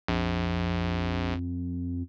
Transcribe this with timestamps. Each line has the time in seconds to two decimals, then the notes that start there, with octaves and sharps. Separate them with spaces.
0.08 A#1 F2